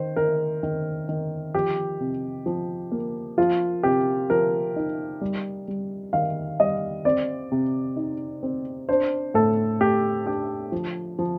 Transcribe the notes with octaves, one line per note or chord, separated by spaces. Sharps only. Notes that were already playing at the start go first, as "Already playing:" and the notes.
Already playing: D#3 C5
D#3 A#4
D#3
D#3
F3 G4
C3
F3
A#3
F3 F4
C3 G4
F3 A#4
D#4
G3
G3
D#3 F5
G3 D#5
C4 D5
C3
D#4
C4
D4 C5
A2 A4
A3 G4
D4 G4
F3
F3